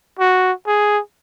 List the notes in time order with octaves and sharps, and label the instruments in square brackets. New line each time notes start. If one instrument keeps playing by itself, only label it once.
[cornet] F#4
G#4